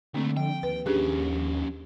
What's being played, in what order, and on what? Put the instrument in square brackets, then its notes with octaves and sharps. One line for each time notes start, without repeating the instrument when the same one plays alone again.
[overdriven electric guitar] C2 A3 [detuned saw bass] D3 [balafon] A#3 C4
[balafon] F3 [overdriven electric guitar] G5
[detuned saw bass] D#2 [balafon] B4
[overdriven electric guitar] F3 C#4 [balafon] D4 G4 G#4